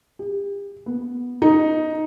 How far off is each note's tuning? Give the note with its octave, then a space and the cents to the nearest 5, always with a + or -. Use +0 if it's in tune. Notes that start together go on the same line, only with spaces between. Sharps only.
G4 +40
B3 -5
D#4 +5